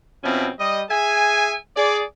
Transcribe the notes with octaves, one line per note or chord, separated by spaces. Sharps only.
B2 F3 C4 C#4 E4
G3 D#5
G#4 E5 G#5
G#4 D5